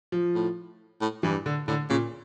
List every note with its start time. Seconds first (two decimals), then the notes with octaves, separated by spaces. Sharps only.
0.12 F3
0.35 A2
1.01 A2
1.23 G2 E3
1.46 D3
1.68 A2 D3
1.89 A#2 C#3